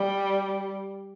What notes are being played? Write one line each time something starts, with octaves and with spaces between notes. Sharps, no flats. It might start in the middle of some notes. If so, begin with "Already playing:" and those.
Already playing: G3